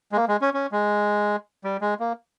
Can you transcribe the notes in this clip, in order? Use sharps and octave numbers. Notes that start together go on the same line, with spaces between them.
G#3
A#3
G#3
C#4
C#4
G#3
G3
G#3
A#3